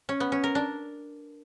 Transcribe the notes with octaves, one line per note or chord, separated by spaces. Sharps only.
C#4
B3
C#4
A#4
D4